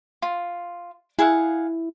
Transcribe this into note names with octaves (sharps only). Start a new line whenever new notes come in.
F4
E4 G#4 F5 F#5